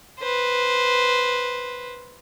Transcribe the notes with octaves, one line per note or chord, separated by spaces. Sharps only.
B4 C5